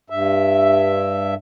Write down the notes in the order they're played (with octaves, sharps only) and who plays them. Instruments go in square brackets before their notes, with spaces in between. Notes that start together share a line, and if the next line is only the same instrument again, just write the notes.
[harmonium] G2 E5